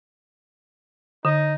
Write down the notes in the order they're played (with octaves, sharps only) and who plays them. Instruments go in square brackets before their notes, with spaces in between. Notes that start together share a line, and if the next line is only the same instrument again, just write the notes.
[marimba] D3 [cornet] D#4